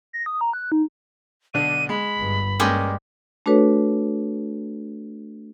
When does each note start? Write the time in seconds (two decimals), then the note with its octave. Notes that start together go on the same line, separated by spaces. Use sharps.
0.13 A#6
0.26 D#6
0.41 A#5
0.53 F#6
0.72 D#4
1.54 B1 D3 D4 D#7
1.89 G#3 B5
2.17 G1 G2
2.60 G2 G3 G#3 A#3 C#4
3.46 A3 D4 F#4 A4 B4 C#5